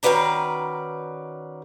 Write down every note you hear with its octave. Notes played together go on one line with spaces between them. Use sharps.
D#3 C#4 F#4 B4 D5 A#5